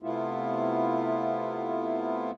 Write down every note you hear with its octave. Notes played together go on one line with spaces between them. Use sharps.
C3 A3 B3 E4 F4